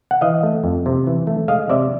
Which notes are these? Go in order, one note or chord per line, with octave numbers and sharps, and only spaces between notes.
F#5
E3 D#5 F5
A3
F2
C3
E3
A3
G#3 D#5 F5
C3 D5 E5